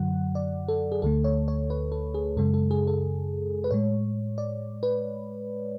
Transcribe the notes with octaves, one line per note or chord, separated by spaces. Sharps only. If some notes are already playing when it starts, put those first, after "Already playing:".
Already playing: F#2 D3 F#3 F#5
D5
A4
G#4
D2 D3 A3 A4
C#5
C#5
B4
A4
G#4
F#2 C#3 G#3 A4
A4
G#4
A4
B4
A2 G#3 C#5
D5
B4